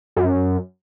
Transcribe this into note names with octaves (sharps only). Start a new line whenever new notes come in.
F#2